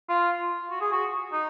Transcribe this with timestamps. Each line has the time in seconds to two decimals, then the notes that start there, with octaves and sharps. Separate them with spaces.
0.09 F4
0.71 F#4
0.81 G#4
0.92 F#4
1.32 D#4